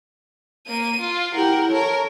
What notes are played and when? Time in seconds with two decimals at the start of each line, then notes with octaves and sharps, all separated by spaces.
0.67 A#3 D#7
1.00 F4
1.34 E4 G4 A#4 F#5
1.71 A4 A#4 C#5